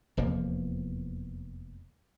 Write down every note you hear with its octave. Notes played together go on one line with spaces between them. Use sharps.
F1 E2 F3 A#3